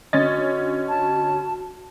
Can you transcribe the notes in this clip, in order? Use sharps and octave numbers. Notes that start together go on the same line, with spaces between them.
D3 C#4 F#4 D#5 A6
A5